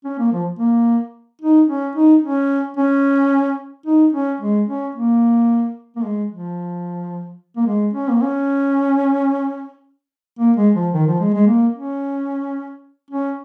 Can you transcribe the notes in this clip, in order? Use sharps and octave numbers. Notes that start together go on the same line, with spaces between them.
C#4
A#3
F3
A#3
D#4
C#4
D#4
C#4
C#4
D#4
C#4
G#3
C#4
A#3
A#3
G#3
F3
A#3
G#3
C#4
A#3
C#4
A#3
G#3
F3
D#3
F3
G#3
G#3
A#3
C#4
C#4